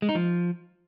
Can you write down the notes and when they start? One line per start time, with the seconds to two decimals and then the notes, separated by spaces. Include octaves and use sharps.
0.02 G#3
0.09 D#4
0.15 F3